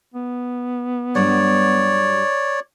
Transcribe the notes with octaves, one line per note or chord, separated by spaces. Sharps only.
B3
G2 F#3 G3 C#5 D5